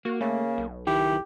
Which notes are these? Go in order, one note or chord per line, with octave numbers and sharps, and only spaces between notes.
A#3 F#4
C#3 A3
B1
D#3 E4 G4